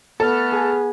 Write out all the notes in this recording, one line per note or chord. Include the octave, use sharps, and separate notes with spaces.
A3 B3 A4 F6
G#4